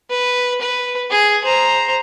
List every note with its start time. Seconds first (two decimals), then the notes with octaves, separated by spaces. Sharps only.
0.10 B4
0.61 B4
1.11 G#4
1.45 C5 A#5